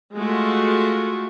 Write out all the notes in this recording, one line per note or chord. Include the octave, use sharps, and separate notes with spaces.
G#3 A3 F4 F#4